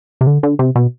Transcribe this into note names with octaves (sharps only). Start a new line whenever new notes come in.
C3
D3
D3
C3
B2